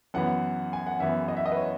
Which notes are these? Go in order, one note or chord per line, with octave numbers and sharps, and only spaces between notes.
F#2 E3 B3 F#5
G#5
F#5
F#2 E3 B3 E5
D#5
E5
D#5
B4
C#5